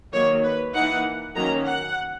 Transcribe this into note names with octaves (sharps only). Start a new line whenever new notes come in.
D#3 F#3 A#3 C#5
B4
E3 A#3 D#4 F#5
D#3 F#3 A#3 C#4 A#5
F#5